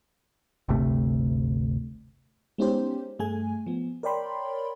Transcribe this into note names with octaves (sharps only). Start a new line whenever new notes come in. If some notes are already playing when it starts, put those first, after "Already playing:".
G1 D2 C3 A3
G#3 B3 C#4 D#4 G4 C5
G2 A3 G#4 G#5
F3 B3
A#4 C#5 D5 G5 B5 C6